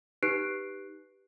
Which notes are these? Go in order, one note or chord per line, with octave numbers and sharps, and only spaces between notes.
D#4 G4 B4 F#6 C7 D7